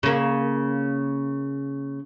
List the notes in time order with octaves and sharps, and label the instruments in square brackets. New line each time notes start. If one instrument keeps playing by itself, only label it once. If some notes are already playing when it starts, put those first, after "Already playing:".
[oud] C#3 A#3